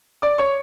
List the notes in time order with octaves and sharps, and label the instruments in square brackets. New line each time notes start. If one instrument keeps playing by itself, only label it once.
[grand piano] D5 D6
C#5 C#6